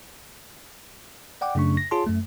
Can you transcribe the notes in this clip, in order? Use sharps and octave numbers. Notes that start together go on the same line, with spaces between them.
D5 F#5 G5 D6
F#2 C#3 A3 D4 C#6
A#6
F4 G#4 C#5 A5 C6
F#2 A3